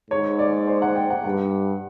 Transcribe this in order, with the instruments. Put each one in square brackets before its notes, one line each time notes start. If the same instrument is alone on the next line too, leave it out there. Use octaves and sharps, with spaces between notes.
[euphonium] G#2 [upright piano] C#5
[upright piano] D5
C5
F#5
G5
F#5
[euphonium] G2 [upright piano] F#5